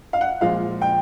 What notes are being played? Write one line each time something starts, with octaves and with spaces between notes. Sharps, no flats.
F5
F#5
A#2 F3 G#3 F5
G5